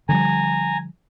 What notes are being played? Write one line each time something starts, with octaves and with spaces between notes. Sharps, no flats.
D3 F3 G3 G#5 A#5